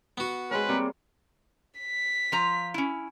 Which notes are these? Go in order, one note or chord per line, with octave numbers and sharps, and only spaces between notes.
B3 F#4
G#3 C4 C#4 B4
C3 G3 A#3
B6
F3 F4 A#5
C#4 E4